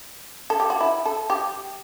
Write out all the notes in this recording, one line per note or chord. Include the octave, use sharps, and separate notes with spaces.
A4
G4
F#4
E4
A4
G4